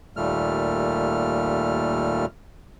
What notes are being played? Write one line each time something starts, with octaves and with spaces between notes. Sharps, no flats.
D#2 A#2 G3 A3 F6